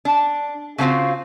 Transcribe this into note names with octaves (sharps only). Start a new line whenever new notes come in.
D4
C#3 F3 C4 F4 F#4